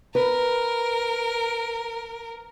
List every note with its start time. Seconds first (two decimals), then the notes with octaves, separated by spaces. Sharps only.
0.15 A#4 B4